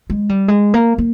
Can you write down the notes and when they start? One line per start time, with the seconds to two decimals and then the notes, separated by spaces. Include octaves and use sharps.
0.10 G#3
0.29 G3
0.48 G#3
0.74 A#3
0.98 A#3